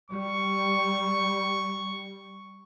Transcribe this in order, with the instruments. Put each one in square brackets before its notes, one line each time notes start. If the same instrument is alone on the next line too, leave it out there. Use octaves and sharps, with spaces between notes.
[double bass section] G3 [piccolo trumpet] C#6